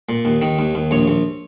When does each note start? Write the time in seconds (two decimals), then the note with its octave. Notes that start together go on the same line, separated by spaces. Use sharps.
0.09 A#2
0.25 D#2
0.42 D#3
0.59 D#2
0.75 D#2
0.91 A#1 C#5
1.08 A#1